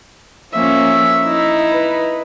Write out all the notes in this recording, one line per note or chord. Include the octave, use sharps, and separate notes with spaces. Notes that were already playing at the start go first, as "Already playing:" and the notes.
F3 A#3 C#4 E5
D#4 E4
B4